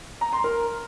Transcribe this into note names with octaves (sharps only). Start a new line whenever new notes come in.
A#5
C6
A#4